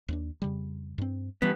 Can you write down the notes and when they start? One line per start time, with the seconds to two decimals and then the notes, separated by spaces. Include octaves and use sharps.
0.08 D#2 B3 D4
0.42 F2 C#3 G3
0.98 G2 C4
1.42 G2 E3 G3 B3 C#4